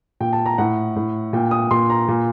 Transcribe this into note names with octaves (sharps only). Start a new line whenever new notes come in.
A#2 G5
A5
A#5
A2 F#5
A2
A#2 G5
D#6
A#2 C6
A#5
A#2